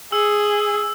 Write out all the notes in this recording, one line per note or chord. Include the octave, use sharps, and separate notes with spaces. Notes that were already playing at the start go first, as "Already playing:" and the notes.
G#4 E6